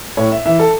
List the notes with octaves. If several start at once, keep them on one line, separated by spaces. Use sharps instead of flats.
A2 C#5
E5
E3 E5
A4